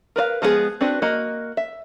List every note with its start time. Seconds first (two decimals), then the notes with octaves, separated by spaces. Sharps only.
0.16 A#4 B4 D5 F5
0.42 F3 G#3 B3 D#4 G#4
0.81 C4 D4 F#4 B4
1.02 A#3 F#4 D#5
1.57 E5